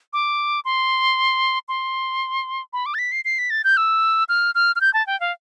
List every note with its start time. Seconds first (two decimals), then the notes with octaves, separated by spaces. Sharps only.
0.13 D6
0.65 C6
1.68 C6
2.73 B5
2.86 D6
2.94 A6
2.99 B6
3.12 C7
3.25 C7
3.38 B6
3.50 A6
3.64 G6
3.77 E6
4.29 F6
4.55 F6
4.76 F6
4.81 G6
4.94 A5
5.07 G5
5.20 F5